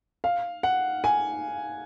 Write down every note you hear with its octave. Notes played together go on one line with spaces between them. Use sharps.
F5
F#5
G#5